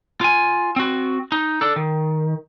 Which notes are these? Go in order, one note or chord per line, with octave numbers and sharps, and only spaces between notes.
F4 G#5
C4 F#4
D#4
D4 A4
D#3